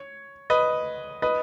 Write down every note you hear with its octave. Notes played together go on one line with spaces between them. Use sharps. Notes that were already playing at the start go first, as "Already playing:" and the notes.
Already playing: C#5
B4 D#5
B4 D#5